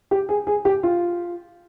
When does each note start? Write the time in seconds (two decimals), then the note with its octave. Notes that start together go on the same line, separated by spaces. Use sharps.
0.11 G4
0.29 G#4
0.47 G#4
0.65 G4
0.83 F4